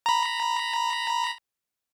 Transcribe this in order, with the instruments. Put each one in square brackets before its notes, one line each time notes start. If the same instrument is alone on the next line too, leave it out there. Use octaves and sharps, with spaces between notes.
[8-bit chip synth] A#5 B5